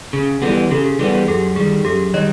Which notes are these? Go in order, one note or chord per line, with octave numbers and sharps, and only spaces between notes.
C#3 G#4
E3 G3 B3 G4 A4
C#3 G4 A4
G#4
E3 G3 B3 G4 A4
G#4
F#2 G4 A4
D#3 G3 G#4
F#2 G4 A4
D#3 G3 C#5 D#5